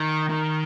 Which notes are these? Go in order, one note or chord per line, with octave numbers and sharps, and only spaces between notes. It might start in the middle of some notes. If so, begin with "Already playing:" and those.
Already playing: D#3
D#3